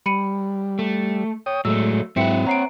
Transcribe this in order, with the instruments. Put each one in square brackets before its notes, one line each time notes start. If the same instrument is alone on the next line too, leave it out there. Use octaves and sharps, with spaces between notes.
[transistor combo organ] G3 [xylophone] B5 C#7 D#7
[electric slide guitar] A3
[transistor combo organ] C#5 G5 D#6
[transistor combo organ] A2 G#3 [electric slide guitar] F#3 A3 [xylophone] E6
[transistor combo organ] G#2 F#3 E4 [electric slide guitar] C4 B4 [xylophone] E5 G5 C#7
[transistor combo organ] C#5 F#5 [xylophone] A#5 C7 D7